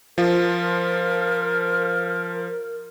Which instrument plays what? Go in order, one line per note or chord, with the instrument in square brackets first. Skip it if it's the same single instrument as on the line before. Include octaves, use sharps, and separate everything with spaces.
[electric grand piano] F3 F4 [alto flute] A#4